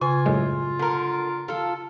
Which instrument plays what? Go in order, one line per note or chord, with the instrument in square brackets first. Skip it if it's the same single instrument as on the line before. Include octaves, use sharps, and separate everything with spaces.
[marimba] C#3 [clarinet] F4 [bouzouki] G#5
[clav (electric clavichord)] F#2 A2 G#3
[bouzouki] D3 A#4
F4 A4